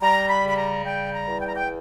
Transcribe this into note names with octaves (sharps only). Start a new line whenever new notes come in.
G3 A#5
B5
C#3
B5
A#5
G3 G5
A#5
E2
G5
A#5
G5